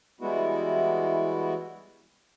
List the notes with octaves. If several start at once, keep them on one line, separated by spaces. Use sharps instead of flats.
E3 G3 G#3 B3 E4 F#4